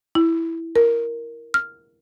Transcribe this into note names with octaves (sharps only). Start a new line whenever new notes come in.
E4
A#4
F6